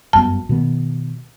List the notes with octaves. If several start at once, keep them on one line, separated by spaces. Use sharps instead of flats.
G1 F#2 B3 A5
B2 D#3 B3